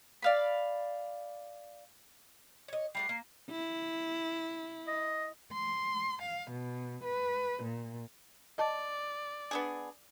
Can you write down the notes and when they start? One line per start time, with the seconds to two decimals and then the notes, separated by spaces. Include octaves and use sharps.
0.22 D5 F5 B5
2.68 C#5 D#5
2.95 G3 A3 F#4 C7
3.09 A#3
3.50 E4
4.88 D#5
5.54 C6
6.22 F5
6.51 B2
7.04 B4
7.62 A#2
8.58 D5 D#5 A5
9.51 B3 D4 G#4